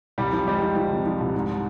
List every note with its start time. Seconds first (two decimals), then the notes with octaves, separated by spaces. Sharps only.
0.18 C2 G3 G4
0.33 F3
0.47 G3 G#3 G4
0.62 F3
0.76 F3
0.91 C3
1.06 F3
1.21 C2
1.34 G#2